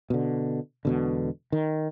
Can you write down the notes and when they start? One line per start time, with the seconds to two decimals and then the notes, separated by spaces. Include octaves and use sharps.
0.10 B2 D3
0.85 E1 B2 D3
1.52 D#3